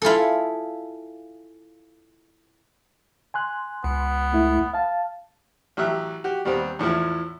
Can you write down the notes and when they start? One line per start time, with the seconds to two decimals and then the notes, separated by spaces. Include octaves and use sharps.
0.02 E4 F4 G#4 A4
3.34 G#5 C6 F#6
3.84 C#2 B3
4.33 A3 E4
4.74 F5 A5
5.77 A1 F#3 G4 E5 F#6
6.24 F#4 G4
6.45 D#2 G3 B3 C4
6.79 E2 A2 F3 E4